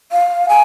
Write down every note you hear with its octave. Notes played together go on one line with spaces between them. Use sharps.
F5
G#5